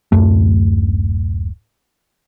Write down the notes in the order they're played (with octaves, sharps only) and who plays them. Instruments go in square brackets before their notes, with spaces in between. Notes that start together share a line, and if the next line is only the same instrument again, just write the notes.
[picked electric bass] D1 F#2 A3